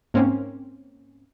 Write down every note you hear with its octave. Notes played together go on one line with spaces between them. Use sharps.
G#2 A#3 C4 C#4